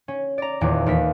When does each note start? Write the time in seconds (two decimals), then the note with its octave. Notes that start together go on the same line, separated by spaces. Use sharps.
0.08 C#4
0.38 D5 A#5
0.61 D#1 E2 D6
0.86 D#2 E3 B6